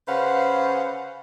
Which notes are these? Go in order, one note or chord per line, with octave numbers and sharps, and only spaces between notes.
C#3 C#4 B4 C5 F5 F#5